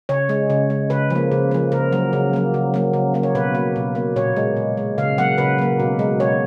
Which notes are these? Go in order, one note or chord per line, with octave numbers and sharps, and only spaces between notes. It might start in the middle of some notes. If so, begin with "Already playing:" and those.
C#3 C#5
G#3
C#3
G#3
C#3 B4
F3 A#3
C#3
F3 A#3
C#3 A#4
F#3 A#3
C#3
F#3 A#3
C#3
F#3 A#3
C#3
F#3 A#3
C#5
B2 B4
A#3
B2
A#3
A#2 C#5
G#3
A#2
G#3
C#3 F5
F#3 A#3 F#5
C#3 B4
F#3 A#3
B2
G#3
B2 C#5